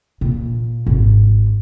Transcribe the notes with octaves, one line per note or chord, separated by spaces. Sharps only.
A#2
G#1